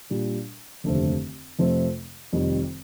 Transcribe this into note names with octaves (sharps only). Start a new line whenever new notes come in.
A#2 G3 D4
F1 D#2 D3 A3 C4
F2 C3 F3 A3 C4
F1 F2 D#3 G3